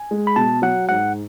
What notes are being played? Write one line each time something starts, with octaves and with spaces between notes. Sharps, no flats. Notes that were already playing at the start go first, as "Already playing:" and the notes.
Already playing: G#5
G#3
B5
B2 A5
F#3 F#5
G#2 F#5